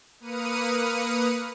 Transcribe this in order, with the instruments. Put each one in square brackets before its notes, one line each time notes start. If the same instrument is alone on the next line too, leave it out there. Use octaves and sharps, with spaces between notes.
[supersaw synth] A#3 B4 D#6 F6 C#7 D#7